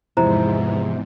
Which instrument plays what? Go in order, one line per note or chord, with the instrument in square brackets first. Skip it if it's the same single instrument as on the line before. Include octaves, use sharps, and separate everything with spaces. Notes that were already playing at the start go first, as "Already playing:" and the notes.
[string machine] E2 G#2 [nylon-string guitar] C3 F3 [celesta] E4 C5 A#5